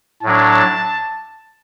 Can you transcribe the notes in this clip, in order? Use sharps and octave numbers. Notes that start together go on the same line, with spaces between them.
A2 F#3 D4 A5